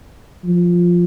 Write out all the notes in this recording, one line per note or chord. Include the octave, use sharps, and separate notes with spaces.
F3